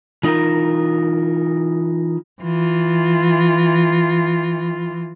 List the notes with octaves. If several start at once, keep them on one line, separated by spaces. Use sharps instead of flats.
E3 D#4 F4 A#4
E3 F4